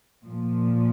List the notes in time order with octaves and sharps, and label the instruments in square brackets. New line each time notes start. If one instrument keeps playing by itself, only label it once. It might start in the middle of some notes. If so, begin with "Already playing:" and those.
[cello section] A#2 F3